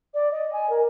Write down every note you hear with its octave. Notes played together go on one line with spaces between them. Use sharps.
D5
D#5
G#5
A#4